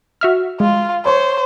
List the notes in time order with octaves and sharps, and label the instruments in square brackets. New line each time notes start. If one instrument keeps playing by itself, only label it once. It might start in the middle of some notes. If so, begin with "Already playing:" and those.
[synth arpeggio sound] F#4 E5 F6
[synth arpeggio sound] G#3 [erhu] F4
[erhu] C5 [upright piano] C#5 C#6